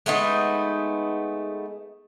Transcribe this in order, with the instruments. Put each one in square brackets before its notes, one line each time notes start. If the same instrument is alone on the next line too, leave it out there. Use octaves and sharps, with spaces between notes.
[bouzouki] G#3 A3 B3 D#4